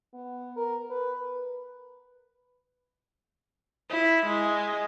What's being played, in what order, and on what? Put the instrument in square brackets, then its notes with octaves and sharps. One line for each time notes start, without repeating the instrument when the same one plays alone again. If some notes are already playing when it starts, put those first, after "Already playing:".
[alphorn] B3
A#4
B4
[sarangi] E4
G#3